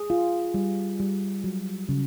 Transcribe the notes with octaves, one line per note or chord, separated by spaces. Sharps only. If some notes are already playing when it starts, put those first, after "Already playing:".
Already playing: G#4
F4
G3
G3
F#3
C#3